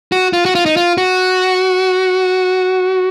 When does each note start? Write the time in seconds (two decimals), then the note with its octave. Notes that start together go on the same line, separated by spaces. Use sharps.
0.12 F#4
0.33 F4
0.45 F#4
0.55 F4
0.66 D#4
0.77 F4
0.98 F#4